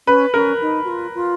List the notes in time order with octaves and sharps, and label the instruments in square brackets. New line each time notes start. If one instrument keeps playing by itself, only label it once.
[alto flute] C#4 [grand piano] B4
[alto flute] C#4 [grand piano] A#4
[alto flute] D#4
F#4
F4
F4